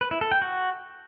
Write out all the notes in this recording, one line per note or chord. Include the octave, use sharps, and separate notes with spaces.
B4
E4
A4
G5
F#4